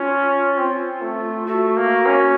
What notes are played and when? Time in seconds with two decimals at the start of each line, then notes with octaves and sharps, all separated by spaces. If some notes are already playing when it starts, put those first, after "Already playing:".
Already playing: C#4 F4
0.57 C4
1.01 A3
1.46 A3 F#4
1.77 A#3
2.06 C#4